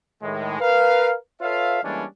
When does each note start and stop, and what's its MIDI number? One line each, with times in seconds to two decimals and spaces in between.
0.22 0.59 45
0.22 0.59 51
0.22 0.59 56
0.60 1.13 70
0.60 1.13 71
0.60 1.13 77
1.41 1.80 65
1.41 1.80 69
1.41 1.80 71
1.41 1.80 73
1.41 1.80 76
1.41 1.80 77
1.83 2.04 52
1.83 2.04 55
1.83 2.04 56
1.83 2.04 58
1.83 2.04 61
1.83 2.04 62